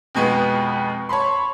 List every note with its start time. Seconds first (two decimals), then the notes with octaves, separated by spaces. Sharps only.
0.15 F2 B2 G#3 B3
1.09 C#5 A5 B5 C6